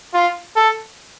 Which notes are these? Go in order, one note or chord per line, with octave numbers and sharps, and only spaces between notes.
F4
A4